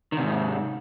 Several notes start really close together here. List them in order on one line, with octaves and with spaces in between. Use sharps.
D#3 C3 G#2